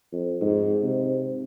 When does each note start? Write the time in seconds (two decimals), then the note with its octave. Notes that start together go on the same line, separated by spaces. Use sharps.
0.12 F2
0.41 G#2
0.83 C3